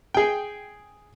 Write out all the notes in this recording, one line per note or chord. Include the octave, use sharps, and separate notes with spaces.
G#4 G5